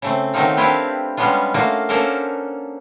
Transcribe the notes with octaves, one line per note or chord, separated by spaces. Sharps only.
C#3 A3 C4
D#3 F#3 A3 C4 D#4 F4
C4 D4 E4 F4 G4 B4
G3 G#3 B3 C#4 D4 F4
A3 A#3 F4 F#4
A#3 C#4 D4 A4 A#4 C5